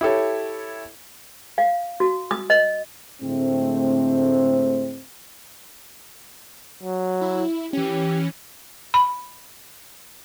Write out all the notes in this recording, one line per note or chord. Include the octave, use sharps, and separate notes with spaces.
E4 G4 A4 C#5
F5
F#4
D#6
D#5
A2 D3 G#3 A3 C4
F#3
E4
E3 C#4 G4
B5